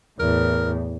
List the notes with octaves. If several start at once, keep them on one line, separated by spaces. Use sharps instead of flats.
E2 A2 A#4